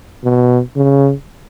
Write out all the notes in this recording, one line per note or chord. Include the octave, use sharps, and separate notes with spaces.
B2
C#3